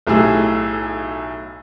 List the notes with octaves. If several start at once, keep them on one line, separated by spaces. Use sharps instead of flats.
B1 A2 G4 G#4 E6